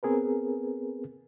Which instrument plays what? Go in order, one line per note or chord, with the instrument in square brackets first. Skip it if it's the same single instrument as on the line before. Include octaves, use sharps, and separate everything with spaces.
[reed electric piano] B3 C4 G#4 A#4 B4